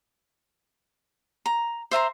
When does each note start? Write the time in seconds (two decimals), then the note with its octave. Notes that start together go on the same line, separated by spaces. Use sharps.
1.46 A#5
1.91 C5 E5 A#5 C6